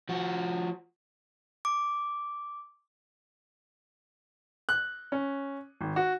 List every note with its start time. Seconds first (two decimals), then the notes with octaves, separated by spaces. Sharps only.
0.09 F3 F#4
1.65 D6
4.69 F#6
5.12 C#4
5.81 G#1
5.96 F#4